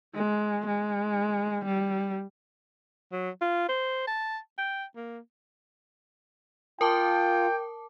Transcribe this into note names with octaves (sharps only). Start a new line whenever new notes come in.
G#3
G#3
G3
F#3
F4
C5
A5
G5
A#3
F4 A#4 G5 A5 D6